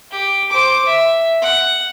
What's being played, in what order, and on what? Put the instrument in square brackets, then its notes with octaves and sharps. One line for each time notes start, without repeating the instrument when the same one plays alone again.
[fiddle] G4
C5 D6
E5
F#5